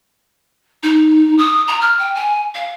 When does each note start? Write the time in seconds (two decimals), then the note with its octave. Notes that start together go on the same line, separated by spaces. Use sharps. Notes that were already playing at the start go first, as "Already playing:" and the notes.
0.83 D#4
1.38 D#6
1.68 A#5
1.81 F6
1.99 G5
2.15 G#5
2.54 F5